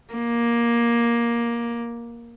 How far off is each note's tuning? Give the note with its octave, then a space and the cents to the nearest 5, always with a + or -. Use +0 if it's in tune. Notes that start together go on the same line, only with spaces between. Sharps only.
A#3 +10